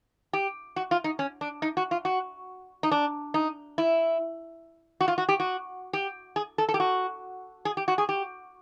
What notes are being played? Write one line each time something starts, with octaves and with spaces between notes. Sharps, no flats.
G4
F#4
F4
D#4
C#4
D4
D#4
F#4
F4
F#4
D#4
D4
D#4
E4
F#4
F4
F#4
G4
F#4
G4
G#4
A4
A4
G4
F#4
G#4
G4
F#4
G#4
G4